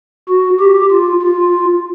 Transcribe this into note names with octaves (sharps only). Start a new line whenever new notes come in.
F#4
G4
F4
F4